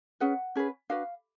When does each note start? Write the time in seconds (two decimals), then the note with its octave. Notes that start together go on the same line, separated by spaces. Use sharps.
0.20 C#4 G#4 B4 F#5
0.55 C#4 G#4 B4
0.90 D4 F#4 B4 F5